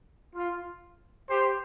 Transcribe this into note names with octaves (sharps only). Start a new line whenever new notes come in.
F4
G4 C5